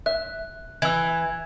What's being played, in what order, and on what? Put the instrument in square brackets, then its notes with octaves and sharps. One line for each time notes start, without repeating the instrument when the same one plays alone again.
[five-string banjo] E5 [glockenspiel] F#6
[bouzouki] E3 [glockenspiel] E6 G#6